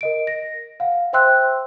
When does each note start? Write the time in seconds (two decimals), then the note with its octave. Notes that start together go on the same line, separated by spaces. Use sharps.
0.01 A#4 D#5 D7
0.27 A#6
0.80 F5 F#5
1.13 C5 E5 G5 C6 E6 F#6